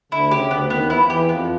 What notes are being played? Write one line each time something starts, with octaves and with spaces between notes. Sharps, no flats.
D2 D3 E4
C#3 G4
D2 D3 B3
D3
D#2 D#3 B3
E3 E4
F3
E2 E3 G4
F2 F3 B3